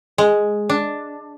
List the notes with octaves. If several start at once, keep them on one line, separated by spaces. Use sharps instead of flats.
G#3
D4